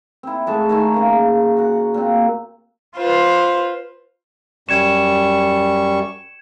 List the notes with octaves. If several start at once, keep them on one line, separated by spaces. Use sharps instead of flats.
C4 E4
A2 G#3 A5 C#6
D#3 A3 G#5
C#3 A#3
F#4 F#5
A#2 C4
F4 B4 C5
F#2 G3 C#6 G#6 C#7 E7